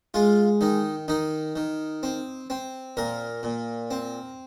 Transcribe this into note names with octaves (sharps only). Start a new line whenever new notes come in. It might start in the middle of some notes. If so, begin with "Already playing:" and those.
G#3 F4
D#3 D#4
D#3 D#4
D#3
C4
C4
A#2 A#4
A#2
C4